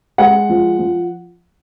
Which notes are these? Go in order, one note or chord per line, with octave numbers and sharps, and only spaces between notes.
G#3 F#5
F3
F3